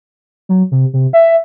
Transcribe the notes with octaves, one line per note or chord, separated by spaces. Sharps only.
F#3
C3
C3
E5